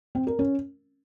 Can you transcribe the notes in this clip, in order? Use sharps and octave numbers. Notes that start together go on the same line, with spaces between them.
C4
A#4
C#4